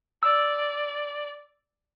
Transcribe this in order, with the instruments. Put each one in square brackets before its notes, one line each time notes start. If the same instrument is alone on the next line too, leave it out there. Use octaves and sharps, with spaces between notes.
[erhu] D5 [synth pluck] E6